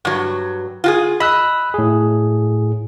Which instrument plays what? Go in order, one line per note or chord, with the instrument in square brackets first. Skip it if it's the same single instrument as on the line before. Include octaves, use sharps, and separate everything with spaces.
[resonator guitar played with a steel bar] G2 F#3
F4 F#4 G#4
[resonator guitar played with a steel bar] D#5 [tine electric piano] B5 E6 F#6
[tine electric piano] A2 G#4